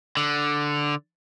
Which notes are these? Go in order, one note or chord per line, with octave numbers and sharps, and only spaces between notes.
D3